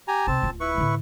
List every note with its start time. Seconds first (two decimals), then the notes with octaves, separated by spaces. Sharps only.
0.08 G4 G#5 A#5
0.27 B1 C3 C4 A5
0.42 D1 F4
0.60 E4 B4 C#6
0.77 A2 D3